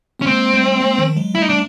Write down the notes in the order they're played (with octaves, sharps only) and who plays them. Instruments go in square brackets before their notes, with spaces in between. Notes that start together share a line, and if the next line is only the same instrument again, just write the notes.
[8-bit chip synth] B3 [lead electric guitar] C#4
[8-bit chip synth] G#3 A#3 [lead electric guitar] C4
[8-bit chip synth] G3 A3
A3
G#3 A#3
D#3 F3
F#3 G#3
[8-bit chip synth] G3 A3 [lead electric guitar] E4
[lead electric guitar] D#4
D4